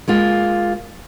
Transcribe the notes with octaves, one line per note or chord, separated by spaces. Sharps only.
G#3 A#3 F4